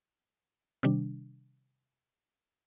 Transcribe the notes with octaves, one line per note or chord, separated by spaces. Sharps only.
C3 D#3 G3 D4